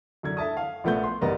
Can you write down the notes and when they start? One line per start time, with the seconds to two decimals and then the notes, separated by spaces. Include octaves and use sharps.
0.23 F#2 D3 G#6
0.37 A4 E5 A5 D#6
0.57 F5
0.84 A#1 F3 A3 B3 F#5 G6
1.03 C6
1.21 F#1 G2 B3 D5 D#5 A#5